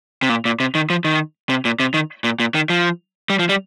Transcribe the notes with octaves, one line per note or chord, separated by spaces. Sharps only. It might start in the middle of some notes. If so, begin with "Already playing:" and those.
C3
A#2
A#2
C3
D#3
F3
D#3
C3
A#2
C3
D#3
A#2
A#2
D#3
F3
G3
F3
G3